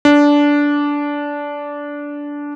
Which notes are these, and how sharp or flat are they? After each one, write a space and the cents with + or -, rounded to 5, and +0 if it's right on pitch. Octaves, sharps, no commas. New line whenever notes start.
D4 -15